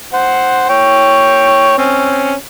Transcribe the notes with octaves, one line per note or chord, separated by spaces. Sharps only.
C5 F#5
C#5 G5
C4 C#4